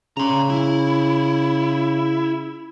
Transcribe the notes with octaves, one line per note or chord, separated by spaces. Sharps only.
C#3 A#5 C6
E4